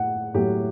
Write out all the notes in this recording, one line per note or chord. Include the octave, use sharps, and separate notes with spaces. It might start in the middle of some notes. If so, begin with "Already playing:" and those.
Already playing: A2 F#5
A2 F#3 A3 G4